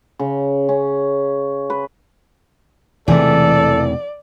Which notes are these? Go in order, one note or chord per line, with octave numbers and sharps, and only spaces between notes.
C#3
C#4
B4
E1 C3 E3 A3 G#4 A4 D5